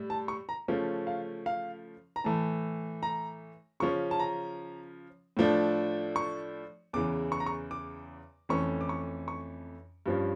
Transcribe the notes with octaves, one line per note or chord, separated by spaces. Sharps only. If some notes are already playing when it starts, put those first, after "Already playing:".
Already playing: A2 G3
A5
C#6
A#5
C#3 F3 A3 C#4
F5
F5
A#5
A2 E3 A3 A5
A#5
C#3 F3 C#4 C#6
A5
A#5
A2 F3 A3 D4
C#6
E2 C#3 E3 D6
C#6
A#5
C#6
D6
F2 E3 A3 C#4 C#6
D6
C#6
C#6
G2 F3 C#4